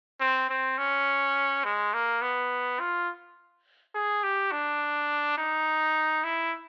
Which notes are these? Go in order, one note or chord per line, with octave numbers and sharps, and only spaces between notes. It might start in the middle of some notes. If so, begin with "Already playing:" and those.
C4
C4
C#4
G#3
A#3
B3
F4
G#4
G4
D4
D#4
E4